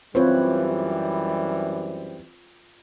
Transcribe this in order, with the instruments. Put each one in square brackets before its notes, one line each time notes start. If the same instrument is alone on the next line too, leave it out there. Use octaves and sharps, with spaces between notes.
[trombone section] F#2 E3 G3 [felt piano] C4 [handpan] F4 B4 C#5